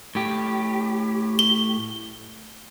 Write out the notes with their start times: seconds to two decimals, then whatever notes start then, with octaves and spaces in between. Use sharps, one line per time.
0.15 A2 G4
1.39 G7